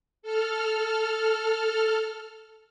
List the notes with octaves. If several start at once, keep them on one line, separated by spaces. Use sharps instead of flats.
A4 F6